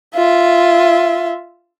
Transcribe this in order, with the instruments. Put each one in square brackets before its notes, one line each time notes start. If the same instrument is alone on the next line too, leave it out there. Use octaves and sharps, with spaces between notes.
[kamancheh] F4 E5